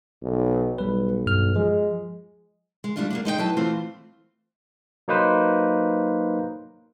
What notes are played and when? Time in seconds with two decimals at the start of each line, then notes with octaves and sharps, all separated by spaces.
0.23 B1
0.78 B1 G3 B4
1.26 G2 F6
1.56 F3 G#3
2.84 G#3
2.96 G3 A3 A#3 D4 E4 F4
3.10 A#3 B3 D4
3.25 G#3 D#4 A4 G5
3.38 F#3 E4 B4 A5
3.57 E3 A3 C4 F4 C5
5.08 F#3 A#3 D#4 B4 C5